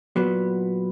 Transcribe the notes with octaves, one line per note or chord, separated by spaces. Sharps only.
A#2 F#3 B3